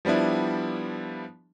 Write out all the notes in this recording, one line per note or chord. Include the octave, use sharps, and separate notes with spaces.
F3 G3 B3 D4 E4